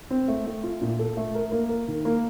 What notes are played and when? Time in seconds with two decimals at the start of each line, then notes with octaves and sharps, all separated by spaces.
0.10 C4
0.28 A3
0.47 A3
0.63 F4
0.81 A#2
0.99 A4
1.17 A3
1.35 A#4
1.52 A#3
1.69 A#4
1.88 D#3
2.05 A#3